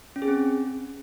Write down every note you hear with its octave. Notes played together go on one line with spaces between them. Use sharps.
C#4
G#4
C4